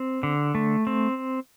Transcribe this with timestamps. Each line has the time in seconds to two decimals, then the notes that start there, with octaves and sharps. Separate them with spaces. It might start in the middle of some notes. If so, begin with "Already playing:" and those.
Already playing: C4
0.23 D3
0.55 A3
0.87 C4